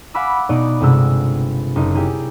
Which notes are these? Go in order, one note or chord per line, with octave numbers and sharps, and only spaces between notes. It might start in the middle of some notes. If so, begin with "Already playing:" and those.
F5 F#5 G#5 B5 D6 E6
B2 B3 D#4 D5 D#6
G1 C3 G#3 E6
F#1 D#4
E4 G4 G#4 A#4